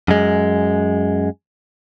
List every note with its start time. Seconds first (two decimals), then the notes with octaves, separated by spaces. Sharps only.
0.08 F#2 G#3